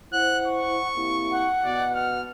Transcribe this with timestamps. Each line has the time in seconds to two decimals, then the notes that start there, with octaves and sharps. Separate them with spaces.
0.13 E4 C5 F#5 F#6
0.47 C#6
0.97 C3 A#3 E4
1.31 F#5
1.65 B2 D5
1.95 F6